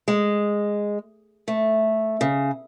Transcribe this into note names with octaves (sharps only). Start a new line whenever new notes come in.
G#3
A3
C#3